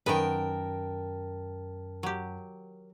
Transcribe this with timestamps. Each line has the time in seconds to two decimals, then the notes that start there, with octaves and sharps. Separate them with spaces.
0.06 F#2 D#3 B3 A#4 B4 G5 A5
2.03 F#3 G4